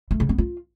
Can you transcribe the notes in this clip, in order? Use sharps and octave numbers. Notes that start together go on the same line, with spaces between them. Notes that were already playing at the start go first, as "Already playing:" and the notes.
A3
C#3
B3
F4